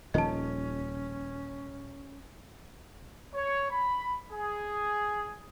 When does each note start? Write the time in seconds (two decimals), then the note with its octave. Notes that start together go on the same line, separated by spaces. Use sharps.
0.14 D#1 D#3 F3 C#4 D#5 A5
3.35 C#5
3.70 B5
4.31 G#4